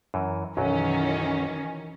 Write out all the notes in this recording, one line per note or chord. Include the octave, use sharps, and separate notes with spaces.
F#2 E3
B1 F#2 D#3 E3 F#3 C#4